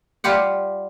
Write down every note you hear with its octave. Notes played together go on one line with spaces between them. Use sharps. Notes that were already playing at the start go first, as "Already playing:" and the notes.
G3 F4 G4 F#5